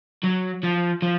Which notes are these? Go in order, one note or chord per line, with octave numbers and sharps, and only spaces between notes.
F#3
F3
F3